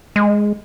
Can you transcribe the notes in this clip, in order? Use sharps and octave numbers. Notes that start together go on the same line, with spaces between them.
G#3